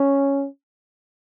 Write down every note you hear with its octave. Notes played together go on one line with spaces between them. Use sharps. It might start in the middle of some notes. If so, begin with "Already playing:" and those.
Already playing: C#4